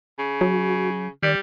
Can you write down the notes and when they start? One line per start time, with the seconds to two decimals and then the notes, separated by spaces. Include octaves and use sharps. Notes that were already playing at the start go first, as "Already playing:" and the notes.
0.19 C#3
0.41 F#3 F#4
1.23 D#3 G3 D5